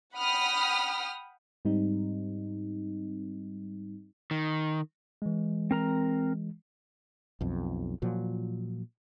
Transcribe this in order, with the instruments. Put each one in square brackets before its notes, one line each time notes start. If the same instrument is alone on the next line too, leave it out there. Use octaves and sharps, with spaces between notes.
[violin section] F#5 G5 B5 D#6 F6
[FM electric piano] G#2 G3 C4 D#4
[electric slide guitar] D#3
[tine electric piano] E3 G#3
[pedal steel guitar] C4 A#4 A#5
[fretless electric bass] B1 F2
A#2 F3 F#3